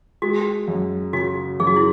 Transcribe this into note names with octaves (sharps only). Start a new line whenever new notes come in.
G#3 F#4
F#2
C#3 F#4
F#2 G#4
F#4
E4